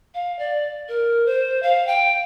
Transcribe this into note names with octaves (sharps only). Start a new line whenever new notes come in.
F5
D5
A#4
C5
F5
G5